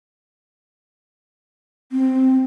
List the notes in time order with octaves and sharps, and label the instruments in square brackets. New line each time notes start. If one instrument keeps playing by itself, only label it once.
[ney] C4